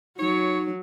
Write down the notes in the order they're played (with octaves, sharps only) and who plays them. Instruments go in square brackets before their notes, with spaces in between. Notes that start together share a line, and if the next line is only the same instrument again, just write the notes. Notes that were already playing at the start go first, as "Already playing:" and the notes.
[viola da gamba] F#3 [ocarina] D#4 [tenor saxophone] C#5